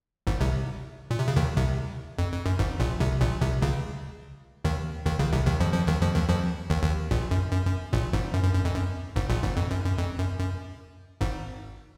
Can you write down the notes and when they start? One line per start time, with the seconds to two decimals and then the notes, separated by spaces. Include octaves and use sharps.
0.27 G#1 G#2
0.41 C2 C3
1.11 A#2
1.19 C3
1.28 C#3
1.36 D#2 D#3
1.57 C2 C3
2.19 F2
2.32 F2
2.46 F#2
2.59 G#1 G#2
2.80 A#1 A#2
3.00 C2 C3
3.21 A#1 A#2
3.41 C2 C3
3.62 C#2 C#3
4.65 D#2 D#3
5.06 D#2 D#3
5.19 C#2 C#3
5.33 C2 C3
5.46 D#2 D#3
5.60 F2 F3
5.73 F2 F3
5.87 D#2 D#3
6.01 F2 F3
6.15 D#2 D#3
6.29 F2 F3
6.70 D#2 D#3
6.83 D#2 D#3
7.11 A#1 A#2
7.31 F#2
7.52 F#2
7.66 F#2
7.93 A#1 A#2
8.13 G#1 G#2
8.34 F#2
8.44 F#2
8.55 F#2
8.65 F2
8.75 F#2
9.16 G#1 G#2
9.30 A#1 A#2
9.43 G#1 G#2
9.57 F2
9.71 F#2
9.85 F#2
9.98 F2
10.19 F#2
10.39 F#2
11.21 G#1 G#2